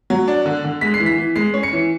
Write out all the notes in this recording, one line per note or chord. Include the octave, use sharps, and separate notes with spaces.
F#3
D4
D3
D3
G#3 B6
C7
E3
B6
E3
G#3 C7
C#4
C#7
E3